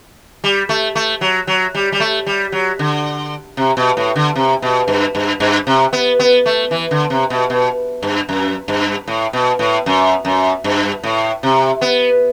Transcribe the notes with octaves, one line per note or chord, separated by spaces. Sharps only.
G3
A3
A3
F#3
F#3
G3
G3
A3
G3
F#3
D3
C3
B2
A2
D3
C3
B2
G2
G2
G2
C3
B3
B3
A3
E3
D3
C3
B2
B2
G2
F#2
G2
A2
B2
A2
F#2
F#2
G2
A2
C3
B3